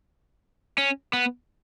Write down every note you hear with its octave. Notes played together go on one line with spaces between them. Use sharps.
C#4
B3